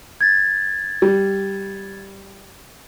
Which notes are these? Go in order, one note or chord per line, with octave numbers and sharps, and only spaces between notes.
G#6 A6
G3